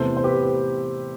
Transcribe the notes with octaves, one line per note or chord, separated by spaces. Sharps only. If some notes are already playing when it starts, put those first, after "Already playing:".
Already playing: E2 C3 E3 A3 A4 C5
C5
G4 B4